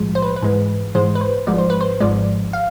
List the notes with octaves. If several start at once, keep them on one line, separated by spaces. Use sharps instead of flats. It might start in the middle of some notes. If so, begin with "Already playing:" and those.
Already playing: B1 A2 F3 G#3
C5
B4
B4
G#2 E3 G#3
G#2 E3 G#3 C5
B4
C5
G#1 G#2 F3 G#3 D5
C5
B4
C5
G#1 G#2 F3 G#3 D5
F5